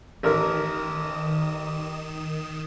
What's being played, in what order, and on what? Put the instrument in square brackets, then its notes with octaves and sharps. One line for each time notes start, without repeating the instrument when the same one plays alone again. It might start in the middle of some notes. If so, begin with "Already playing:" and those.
[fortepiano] A1 A#4 [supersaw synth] D#3 D#6 E7